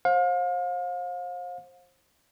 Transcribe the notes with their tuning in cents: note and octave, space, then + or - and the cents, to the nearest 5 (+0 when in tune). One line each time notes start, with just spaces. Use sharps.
C5 +30 F5 +35